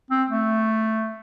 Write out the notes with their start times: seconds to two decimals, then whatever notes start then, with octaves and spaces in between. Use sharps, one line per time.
0.11 C4
0.30 A3